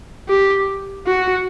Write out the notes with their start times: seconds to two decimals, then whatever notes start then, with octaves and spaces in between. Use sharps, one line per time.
0.29 G4
1.07 F#4